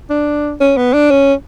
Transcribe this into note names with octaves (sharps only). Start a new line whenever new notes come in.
D4
C#4
B3
D4
C#4